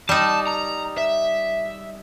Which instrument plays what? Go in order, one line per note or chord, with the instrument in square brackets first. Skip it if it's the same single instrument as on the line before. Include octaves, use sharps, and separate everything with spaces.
[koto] G3 D#4 [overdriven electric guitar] A5
[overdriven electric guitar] A#5
E5